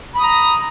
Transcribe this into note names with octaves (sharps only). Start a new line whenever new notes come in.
A#5 B5 D#6